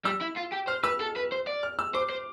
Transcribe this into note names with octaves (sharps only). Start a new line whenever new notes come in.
G3 E6
E4
F4
G4
C5 F6
B4 E6
A4
B4
C5
D5
F6
E6
C5 D6
C5